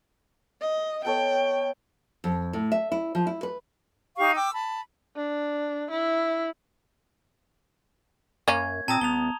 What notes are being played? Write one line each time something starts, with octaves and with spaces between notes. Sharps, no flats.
D#5
B3 A4 C#5 G5
F2
A2
E5
E4
F3
E4
B4
D#4 G4 F5 C#6
G5 D6 E6
A5 B5
D4
E4
F#2 A#3 C#4 G#6
A#2 C4 A5 A#5 D#6
D#1 B3 F7 G7